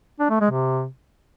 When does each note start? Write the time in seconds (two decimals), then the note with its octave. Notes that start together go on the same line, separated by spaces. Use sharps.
0.20 D4
0.30 A3
0.40 G#3
0.51 C3